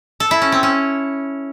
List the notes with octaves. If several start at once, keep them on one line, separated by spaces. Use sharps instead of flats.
A4
E4
C#4
C4
C#4